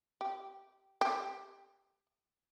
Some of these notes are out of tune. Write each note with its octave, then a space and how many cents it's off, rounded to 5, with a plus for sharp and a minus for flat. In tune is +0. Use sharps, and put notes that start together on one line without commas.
G4 -15
G4 +10